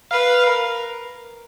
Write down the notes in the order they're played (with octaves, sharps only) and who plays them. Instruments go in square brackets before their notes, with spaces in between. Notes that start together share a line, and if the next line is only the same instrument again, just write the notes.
[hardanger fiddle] B4 [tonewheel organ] F5
[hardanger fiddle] A#4